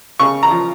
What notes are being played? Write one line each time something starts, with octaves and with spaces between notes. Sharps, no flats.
C#3 C#6
A#5
F3